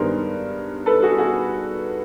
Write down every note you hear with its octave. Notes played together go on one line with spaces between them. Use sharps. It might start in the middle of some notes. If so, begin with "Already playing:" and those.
Already playing: G2 D#3 G#3 B3 A#4 C5
A4 B4
F#4 G#4
F#4 G#4